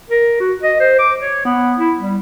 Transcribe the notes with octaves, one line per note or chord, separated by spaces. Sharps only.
A#4
F#4
D#5
C5
D6
C#5
B3
E4
G3